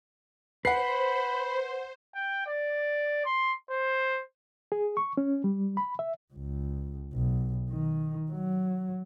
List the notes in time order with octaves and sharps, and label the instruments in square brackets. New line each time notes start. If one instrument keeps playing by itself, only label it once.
[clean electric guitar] B4 [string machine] C5 [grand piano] F#5 C7 [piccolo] B5
[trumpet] G5
D5
C6
C5
[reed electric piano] G#4
C#6
C#4
G3
B5
E5
[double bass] C#2
B1
D#3
F#3